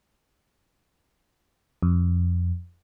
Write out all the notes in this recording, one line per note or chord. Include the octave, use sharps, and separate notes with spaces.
F2